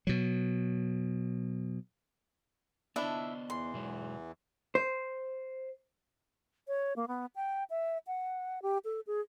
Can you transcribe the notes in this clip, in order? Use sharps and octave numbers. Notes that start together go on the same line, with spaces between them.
B2 F#3
B3 D4 E4 C5 D#5 E5
E2 E3 C6
B2 F#3 G#3
C5
C#5
A#3
B3
G5
E5
F#5
G4
A4
G#4